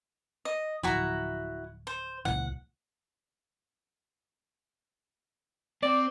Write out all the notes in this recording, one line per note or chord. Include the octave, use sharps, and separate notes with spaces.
D#5
D1 G1 F3 E4 F#4 A#5
C5
C#2 A#2 E3 F#5
C4 D5